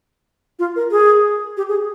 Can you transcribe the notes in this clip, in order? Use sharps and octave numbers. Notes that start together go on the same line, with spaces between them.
F4
A#4
G#4
G4
G#4